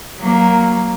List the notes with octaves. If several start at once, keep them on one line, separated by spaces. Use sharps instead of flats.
F#3 A#3